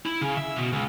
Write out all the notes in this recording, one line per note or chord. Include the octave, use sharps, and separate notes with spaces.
E4
C#3
E5
B2
C#2